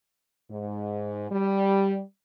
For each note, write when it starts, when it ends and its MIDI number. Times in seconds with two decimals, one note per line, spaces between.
0.50 1.27 44
1.30 2.00 55